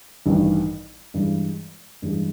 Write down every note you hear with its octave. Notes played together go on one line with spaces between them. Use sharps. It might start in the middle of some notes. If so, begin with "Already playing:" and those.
A1 G2 D#3
G2 E3 G#3
G2 E3 G#3